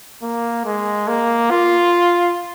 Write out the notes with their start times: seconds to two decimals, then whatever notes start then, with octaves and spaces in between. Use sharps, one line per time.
0.23 A#3
0.65 G#3
1.08 A#3
1.50 F4